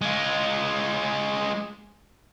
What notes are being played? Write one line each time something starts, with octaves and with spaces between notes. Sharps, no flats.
G#3 F4